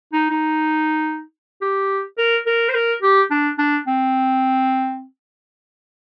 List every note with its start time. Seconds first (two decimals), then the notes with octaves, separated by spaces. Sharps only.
0.13 D#4
0.31 D#4
1.62 G4
2.18 A#4
2.46 A#4
2.69 C5
2.74 A#4
3.02 G4
3.31 D4
3.58 D4
3.87 C4